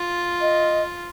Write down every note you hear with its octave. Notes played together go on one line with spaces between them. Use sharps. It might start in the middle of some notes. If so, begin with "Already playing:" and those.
Already playing: F4
D#5